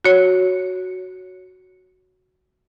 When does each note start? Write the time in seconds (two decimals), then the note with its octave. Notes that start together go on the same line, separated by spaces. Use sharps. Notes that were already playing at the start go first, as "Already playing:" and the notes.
0.04 F#4 C#5